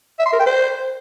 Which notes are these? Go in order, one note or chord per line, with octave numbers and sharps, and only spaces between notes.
E5
C6
A#4
G5
C5